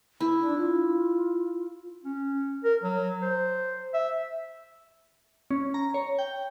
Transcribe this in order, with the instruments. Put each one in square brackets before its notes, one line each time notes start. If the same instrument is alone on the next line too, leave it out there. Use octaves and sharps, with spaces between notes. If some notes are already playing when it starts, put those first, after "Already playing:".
[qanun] E4
[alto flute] D4
F4
[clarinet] C#4
A#4
F#3
C5
E5
[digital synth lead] C#4
A#5
C#5
G5